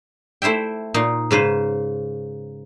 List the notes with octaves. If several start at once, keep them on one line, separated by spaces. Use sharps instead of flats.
A3 E4 C5 E5 G5
A#2 D#4 C6
G#2 C#3 B4 C5